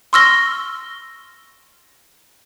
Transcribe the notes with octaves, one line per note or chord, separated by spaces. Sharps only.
C6 C#6 E6 F6 A#6 G7